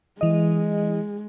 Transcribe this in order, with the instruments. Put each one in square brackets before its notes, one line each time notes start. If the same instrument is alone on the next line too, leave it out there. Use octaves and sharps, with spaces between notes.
[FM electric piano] E3 D#5 [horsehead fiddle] G#3